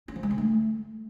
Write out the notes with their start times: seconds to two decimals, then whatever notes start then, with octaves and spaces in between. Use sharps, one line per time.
0.08 C#4
0.16 F3
0.23 G#3
0.30 D3
0.38 A3